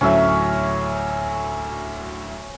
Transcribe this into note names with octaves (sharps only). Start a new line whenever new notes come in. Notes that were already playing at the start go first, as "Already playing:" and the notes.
D2 A2 F#3 C#4 E5